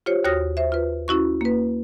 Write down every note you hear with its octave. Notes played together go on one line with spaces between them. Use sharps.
F4 G4 C5 C#5
D#2 F#4 C#5 D#6 F6 A#6
C5 E5
F4 B4
C#4 E4 F#4 C#6
A#3 B4